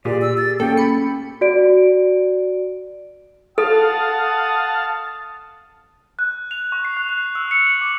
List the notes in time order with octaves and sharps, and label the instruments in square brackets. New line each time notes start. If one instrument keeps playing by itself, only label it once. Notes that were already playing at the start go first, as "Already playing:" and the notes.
[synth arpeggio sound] A#2 [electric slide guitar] G4 G#4 [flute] D5
[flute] E6
A6
[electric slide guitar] A#3 C#4 [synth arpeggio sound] A4 [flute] G5
[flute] B5 [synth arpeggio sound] C#7
[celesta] F#4 D5 D7
[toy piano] A4 [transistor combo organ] F5 A5 [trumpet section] F#5 D#6
[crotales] F#6
F7
C#6
C7
F#6
F#6
E6
C#7
F#7
D6